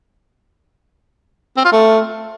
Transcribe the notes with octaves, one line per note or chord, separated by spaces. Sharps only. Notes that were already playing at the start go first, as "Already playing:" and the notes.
C4
F4
A3